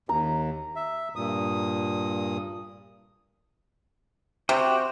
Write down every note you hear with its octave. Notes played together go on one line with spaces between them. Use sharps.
D#2 A#5
E5
G2 A#2 D#6
C3 F#4 G4 C5